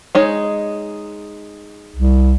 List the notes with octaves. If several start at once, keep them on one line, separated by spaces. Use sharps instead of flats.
G#3 D#4 C#5
C2